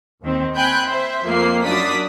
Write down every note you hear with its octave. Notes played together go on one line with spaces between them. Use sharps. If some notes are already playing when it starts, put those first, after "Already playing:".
D#2 D#3 C4
C4 G5 G#5 B5 F#6 G6
C5 E5
F2 A#3 C7
F#2 D4 D5 D#6 B6